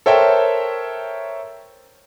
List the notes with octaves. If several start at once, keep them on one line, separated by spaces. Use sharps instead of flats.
A4 A#4 C5 C#5 E5 G5